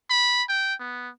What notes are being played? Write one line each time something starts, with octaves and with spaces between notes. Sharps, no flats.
B5
G5
B3